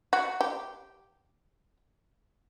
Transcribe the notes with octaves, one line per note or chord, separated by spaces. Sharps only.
F#4
G4